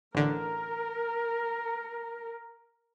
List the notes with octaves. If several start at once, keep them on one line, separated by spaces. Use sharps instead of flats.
A1 D3 A#4